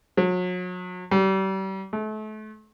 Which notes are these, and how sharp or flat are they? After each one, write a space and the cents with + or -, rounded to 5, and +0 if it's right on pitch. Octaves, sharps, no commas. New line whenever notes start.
F#3 -35
G3 -35
A3 -35